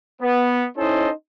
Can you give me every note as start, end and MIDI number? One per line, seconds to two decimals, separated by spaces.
0.22 0.64 59
0.77 1.09 61
0.77 1.09 63
0.77 1.09 64
0.77 1.09 69
0.77 1.09 72
0.77 1.09 75